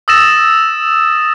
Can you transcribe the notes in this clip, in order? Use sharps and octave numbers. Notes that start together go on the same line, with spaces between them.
D#6 E6 A6 A#6 E7